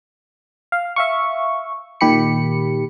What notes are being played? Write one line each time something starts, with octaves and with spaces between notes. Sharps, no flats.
F5
E5 F5 C#6
A#2 D#3 G4 B5 C#7